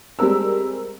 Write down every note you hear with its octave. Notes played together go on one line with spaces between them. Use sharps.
G3 G#3 C4 A#4 E6